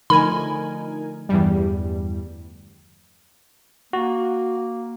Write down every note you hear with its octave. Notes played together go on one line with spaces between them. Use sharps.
D3 F3 A3 D#4 A#4 G#5 B5
E2 G2 G3
A#3 F#4